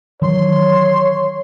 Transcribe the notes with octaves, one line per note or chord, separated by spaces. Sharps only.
D#3 E3 F#3 C#5 C6